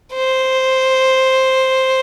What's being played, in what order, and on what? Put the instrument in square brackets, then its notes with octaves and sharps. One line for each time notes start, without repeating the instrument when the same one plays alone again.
[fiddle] C5